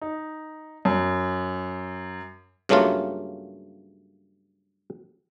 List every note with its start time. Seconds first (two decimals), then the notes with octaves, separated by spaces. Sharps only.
0.02 D#4
0.85 F#2
2.69 G2 C#3 F#3 A3 A#3 F4